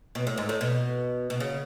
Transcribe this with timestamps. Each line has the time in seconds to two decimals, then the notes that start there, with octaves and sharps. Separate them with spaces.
0.15 B2
0.27 A2
0.38 G#2
0.49 A2
0.61 B2
1.30 B2
1.40 C#3